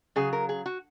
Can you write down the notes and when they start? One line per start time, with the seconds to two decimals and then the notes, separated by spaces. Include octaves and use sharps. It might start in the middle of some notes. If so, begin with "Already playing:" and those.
0.16 C#3 F#3 G#4
0.33 A#4
0.49 G#4
0.66 F#4